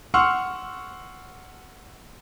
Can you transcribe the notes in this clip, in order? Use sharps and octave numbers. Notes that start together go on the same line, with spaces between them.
F#5 C6 C#6 E6 F6